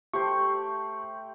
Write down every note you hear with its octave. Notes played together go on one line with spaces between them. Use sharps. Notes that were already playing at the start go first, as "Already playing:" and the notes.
A3 G4 C5 C#6